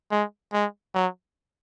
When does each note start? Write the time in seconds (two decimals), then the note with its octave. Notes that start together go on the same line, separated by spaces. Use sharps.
0.11 G#3
0.53 G#3
0.94 F#3